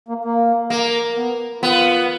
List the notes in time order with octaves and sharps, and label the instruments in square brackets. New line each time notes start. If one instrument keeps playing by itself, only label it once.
[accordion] A#3
A#3
[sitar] A#3
[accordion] B3
[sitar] B3 [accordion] F4